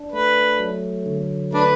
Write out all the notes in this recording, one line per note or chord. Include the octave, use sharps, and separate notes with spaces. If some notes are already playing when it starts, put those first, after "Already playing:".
Already playing: D4
A3 B4
F#3
D3
A3 D4 B4